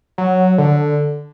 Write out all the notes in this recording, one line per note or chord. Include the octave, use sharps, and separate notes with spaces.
F#3
D3